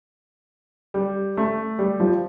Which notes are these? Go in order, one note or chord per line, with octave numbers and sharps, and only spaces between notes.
G3
A3
G3
F3